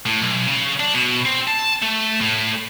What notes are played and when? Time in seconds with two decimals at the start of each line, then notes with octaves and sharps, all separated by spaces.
0.07 A2
0.22 B1
0.48 C#3
0.80 D4
0.94 B2
1.25 C4
1.48 A5
1.82 A3
2.21 A2